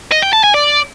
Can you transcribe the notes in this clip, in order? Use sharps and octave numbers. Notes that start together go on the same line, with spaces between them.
D#5
G5
A5
G#5
D5